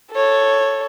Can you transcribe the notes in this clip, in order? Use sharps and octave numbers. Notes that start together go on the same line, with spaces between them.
A4 C#5